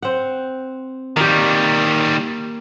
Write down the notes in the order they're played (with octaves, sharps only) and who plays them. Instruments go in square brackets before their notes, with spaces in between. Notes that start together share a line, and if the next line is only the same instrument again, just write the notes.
[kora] C4 F#5
[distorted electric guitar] D#3 G3 [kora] A#3 G4